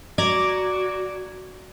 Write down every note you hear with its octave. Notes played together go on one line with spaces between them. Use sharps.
F#4 D5 A#5 D6 G#6